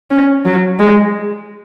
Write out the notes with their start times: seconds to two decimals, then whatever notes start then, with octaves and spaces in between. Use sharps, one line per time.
0.11 C#4
0.45 F#3
0.79 G#3